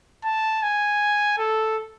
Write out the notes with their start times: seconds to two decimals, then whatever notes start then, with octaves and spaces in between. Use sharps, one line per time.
0.25 A5
0.63 G#5
1.38 A4